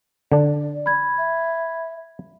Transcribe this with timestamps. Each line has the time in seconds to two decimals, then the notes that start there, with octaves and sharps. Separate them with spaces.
0.32 D3 D4 D5
0.86 B5 G#6
1.18 E5